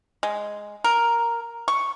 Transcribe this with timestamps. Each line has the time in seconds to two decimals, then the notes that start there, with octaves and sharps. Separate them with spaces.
0.23 G#3
0.84 A#4
1.68 C#6